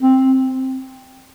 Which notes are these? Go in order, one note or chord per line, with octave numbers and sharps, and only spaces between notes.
C4